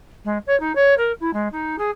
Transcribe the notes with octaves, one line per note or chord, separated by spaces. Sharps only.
G#3
C#5
D#4
C#5
A#4
E4
G#3
D#4
G#4